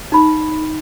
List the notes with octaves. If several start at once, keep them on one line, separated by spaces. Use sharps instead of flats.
D#4 B5